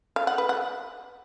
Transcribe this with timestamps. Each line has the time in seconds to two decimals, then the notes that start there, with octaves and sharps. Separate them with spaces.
0.16 F5
0.27 F#5
0.38 B4
0.49 F#5